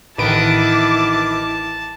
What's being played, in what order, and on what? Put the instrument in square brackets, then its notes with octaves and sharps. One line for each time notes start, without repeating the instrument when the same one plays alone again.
[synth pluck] A1 D7 [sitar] D#3 B3 [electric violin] E4 D6 [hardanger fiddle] A5